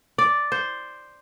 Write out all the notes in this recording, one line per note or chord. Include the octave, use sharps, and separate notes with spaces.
D5
C5